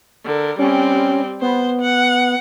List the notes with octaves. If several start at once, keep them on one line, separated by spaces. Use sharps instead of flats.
D3 A#4
G3 C4 C#4
B3 C5
F#5